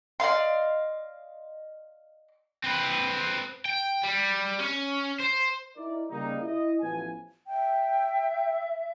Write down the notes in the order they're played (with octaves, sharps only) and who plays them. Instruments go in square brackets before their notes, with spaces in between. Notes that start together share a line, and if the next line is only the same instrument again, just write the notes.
[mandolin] D5 D#5 F5 C6
[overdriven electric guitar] C4 B4
G5
G3
C#4
C5
[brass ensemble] D#4 E4 A#4 D5
C#3 G3 A#3 D#4
E4 D#5
A1 E3 F3 B3 G#5
[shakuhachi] E5 [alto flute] G5